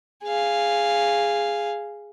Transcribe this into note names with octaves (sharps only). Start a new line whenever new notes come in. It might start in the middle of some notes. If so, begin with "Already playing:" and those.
G#4 F5